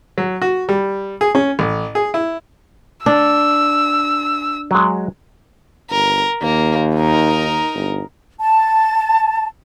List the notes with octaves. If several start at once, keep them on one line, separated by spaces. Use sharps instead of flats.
F#3
F#4
G3
G#4
C#4
A1
G#4
E4
D4 E6
F#3 G#3
G1 A#4
D#2 A#3
D#4 A#4
G1
A5